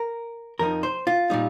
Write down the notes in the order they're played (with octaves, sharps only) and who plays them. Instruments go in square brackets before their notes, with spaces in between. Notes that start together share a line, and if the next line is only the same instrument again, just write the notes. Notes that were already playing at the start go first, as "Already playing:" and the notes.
Already playing: [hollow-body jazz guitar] A#4
F2 F3 D#4 A#4
C5
F4
A#2 G3 D#4